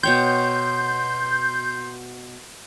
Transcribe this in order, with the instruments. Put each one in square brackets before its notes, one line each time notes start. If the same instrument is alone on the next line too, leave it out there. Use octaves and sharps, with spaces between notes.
[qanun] B2 C#5 G5 [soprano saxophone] C6 [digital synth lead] G6